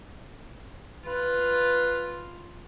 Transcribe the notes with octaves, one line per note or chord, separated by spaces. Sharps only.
F4 B4